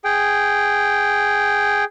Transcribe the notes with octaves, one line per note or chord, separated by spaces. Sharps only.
G#4 G5